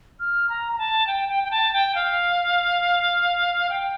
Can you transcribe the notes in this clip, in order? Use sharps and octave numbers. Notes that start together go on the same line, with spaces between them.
F6
A#5
A#5
A5
G5
G5
G5
A5
G5
F5
G5